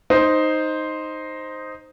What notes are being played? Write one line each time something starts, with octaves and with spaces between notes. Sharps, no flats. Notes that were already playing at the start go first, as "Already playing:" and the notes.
D#4 C5